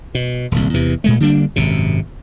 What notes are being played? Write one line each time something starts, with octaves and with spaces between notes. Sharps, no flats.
B2
D#1 C2
E2 C3 E3
A#2 G#3 A3
D3 G3 A#3 D4
G#1 F#2 C3